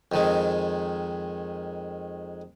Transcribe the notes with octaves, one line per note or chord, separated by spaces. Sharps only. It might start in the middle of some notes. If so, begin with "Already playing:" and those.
F2 D#3 G#3